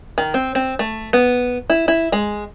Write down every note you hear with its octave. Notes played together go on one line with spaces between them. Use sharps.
D#3
C4
C4
A3
B3
E4
E4
G#3